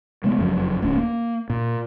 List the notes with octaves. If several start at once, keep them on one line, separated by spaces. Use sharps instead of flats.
C3 G#3 A3 B3
F#1 F2 F#3
D1 A3 C#4 D4
A#3
A#2